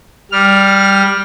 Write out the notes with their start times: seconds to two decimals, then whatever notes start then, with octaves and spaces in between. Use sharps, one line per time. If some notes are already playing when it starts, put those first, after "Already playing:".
0.31 G3 F6